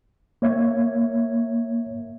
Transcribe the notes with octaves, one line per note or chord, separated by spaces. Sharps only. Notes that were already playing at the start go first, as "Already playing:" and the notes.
A#3 C#5 E5 G#6